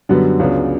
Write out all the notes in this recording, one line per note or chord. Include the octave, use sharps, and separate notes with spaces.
F#2 D3 G3 B3 F#4
C#2 C#3 F#3 B3 D4